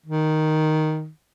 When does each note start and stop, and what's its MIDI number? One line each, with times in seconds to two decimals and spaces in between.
0.06 1.09 51